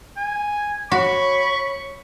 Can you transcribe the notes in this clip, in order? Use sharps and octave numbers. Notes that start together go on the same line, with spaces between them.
G#5
F#4 C#5 B5 C#6